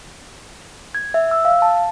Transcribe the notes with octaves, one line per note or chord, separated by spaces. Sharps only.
G#6
E5
E6
F5
A5